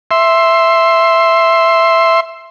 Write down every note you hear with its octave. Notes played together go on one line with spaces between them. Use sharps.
E5 C6